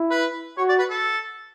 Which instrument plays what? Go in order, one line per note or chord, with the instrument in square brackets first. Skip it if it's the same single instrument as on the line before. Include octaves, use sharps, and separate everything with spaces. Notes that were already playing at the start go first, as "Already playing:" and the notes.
Already playing: [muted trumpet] E4
[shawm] B4
[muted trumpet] F#4 [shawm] C#5
[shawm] D5
B4
A4